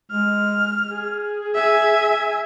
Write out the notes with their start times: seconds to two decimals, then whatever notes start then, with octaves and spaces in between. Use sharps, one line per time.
0.11 G#3 F6
0.89 G#4
1.55 E5 G#5